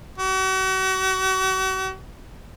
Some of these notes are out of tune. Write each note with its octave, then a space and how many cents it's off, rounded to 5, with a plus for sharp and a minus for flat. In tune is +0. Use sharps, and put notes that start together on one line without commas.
F#4 +40